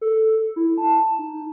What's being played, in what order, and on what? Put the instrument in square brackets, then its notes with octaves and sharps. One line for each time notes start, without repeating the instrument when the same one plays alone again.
[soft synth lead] A4
E4
A5
D#4